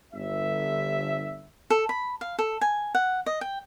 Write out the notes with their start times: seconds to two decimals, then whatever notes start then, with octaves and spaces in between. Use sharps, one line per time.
0.14 G1 E5
1.70 A4
1.89 B5
2.21 F5
2.39 A4
2.61 G#5
2.95 F#5
3.26 D#5
3.41 G5